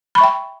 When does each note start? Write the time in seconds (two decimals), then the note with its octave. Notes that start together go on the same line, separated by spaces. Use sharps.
0.15 B5
0.18 C#6
0.21 E5
0.24 G5